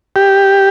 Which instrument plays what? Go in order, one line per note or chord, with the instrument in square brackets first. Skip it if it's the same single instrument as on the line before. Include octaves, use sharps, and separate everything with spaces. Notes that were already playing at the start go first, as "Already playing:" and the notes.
[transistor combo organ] G4